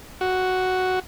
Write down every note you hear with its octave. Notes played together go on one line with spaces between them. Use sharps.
F#4